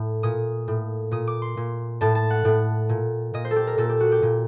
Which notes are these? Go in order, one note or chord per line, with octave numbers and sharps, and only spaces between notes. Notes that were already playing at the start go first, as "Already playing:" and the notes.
Already playing: A2
A#2 D#6
A2
A#2 D#6
D6
C6
A#2
A2 A5
A5
F#5
A2
A#2
A#2 D#5
C5
A4
G4
A#4
A#2 A4
G4
F#4
G4
A#2